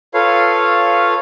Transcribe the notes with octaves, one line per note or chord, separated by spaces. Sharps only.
F4 A4 B4 C#5 F5